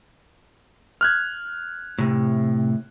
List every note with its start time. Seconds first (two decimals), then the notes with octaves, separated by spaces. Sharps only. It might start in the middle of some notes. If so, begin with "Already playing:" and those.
1.01 F6 F#6 G#6
1.99 A2 C3